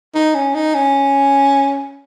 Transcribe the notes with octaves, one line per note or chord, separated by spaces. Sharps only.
D#4
C#4
D#4
C#4